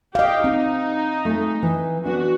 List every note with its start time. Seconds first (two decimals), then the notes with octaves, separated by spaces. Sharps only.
0.15 G4 D#5 F5
0.44 C4 D#4
1.25 G#3 A3
1.63 E3
2.05 B3 D4 F#4